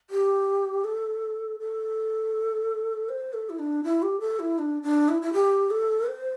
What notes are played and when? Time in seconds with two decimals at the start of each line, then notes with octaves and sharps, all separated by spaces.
0.10 G4
0.84 A4
1.60 A4
3.09 C5
3.33 A4
3.50 E4
3.59 D4
3.84 E4
4.02 G4
4.20 A4
4.40 E4
4.59 D4
4.83 D4
5.09 E4
5.22 E4
5.33 G4
5.70 A4
6.08 C5